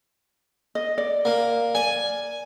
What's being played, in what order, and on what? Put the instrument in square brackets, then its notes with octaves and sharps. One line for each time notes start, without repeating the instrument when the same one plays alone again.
[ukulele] D#5
D5
[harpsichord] A#3
[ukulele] D5 [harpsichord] G#5